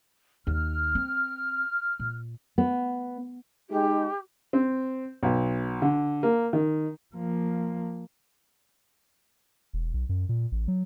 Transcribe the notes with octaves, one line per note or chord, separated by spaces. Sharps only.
D#2 F6
C4
A#2
B3
G#3 D#4 G4
C4
B1
D3
A#3
D#3
F3 A#3
E1
B1
F#2
A#2
A1
F#3